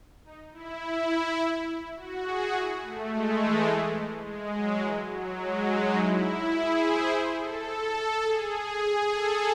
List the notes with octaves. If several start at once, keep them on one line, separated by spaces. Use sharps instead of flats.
D#4
E4
F#4
G#4
E4
A3
G#3
E3
G#3
F#3
E3
F#3
G#3
D#4
E4
G#4
C5
C5
A4
G#4
G#4
A4